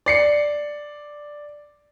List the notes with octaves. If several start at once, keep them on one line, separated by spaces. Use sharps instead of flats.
D5 C7 C#7